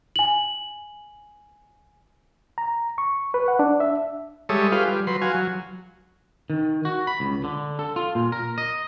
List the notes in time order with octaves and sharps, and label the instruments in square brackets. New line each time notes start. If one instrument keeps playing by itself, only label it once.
[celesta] G#5 F#7
[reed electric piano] A#5
C#6
B4
F#5
D4
E5
[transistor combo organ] G3 G#3 A4 C#5 E5 D#6
F4 G4 G#4 B4 F5
G3
F#3 B4 C6
F#4 F5 G#5
F#3
[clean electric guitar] D#3
F#4
B5
C#2
D3
A4
F4
A#2
A#4
D#5